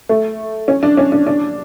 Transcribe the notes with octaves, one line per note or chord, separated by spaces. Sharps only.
A3
C#4
D4
C#4
D4
D4